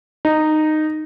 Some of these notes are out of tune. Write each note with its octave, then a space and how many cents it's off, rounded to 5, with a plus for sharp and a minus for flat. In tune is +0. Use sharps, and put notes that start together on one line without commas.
D#4 -10